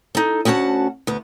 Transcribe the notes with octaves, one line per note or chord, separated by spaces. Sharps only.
D#4 A4
D2 C#4 F#4 F#5 A5
D2 B3